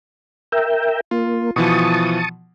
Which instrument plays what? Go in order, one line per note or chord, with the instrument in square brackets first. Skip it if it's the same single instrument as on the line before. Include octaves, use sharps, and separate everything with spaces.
[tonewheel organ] A#4 E5 G5
[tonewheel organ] A#3 [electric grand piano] F4
[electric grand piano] B2 E3 F3 [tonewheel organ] A5 C#6 D#6